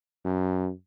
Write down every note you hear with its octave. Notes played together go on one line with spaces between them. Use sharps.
F#2